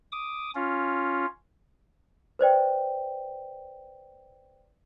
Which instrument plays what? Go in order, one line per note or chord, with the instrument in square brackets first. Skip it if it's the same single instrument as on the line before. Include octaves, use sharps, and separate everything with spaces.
[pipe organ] D6 D#6
C#4 F4
[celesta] B4 C5 D5 G5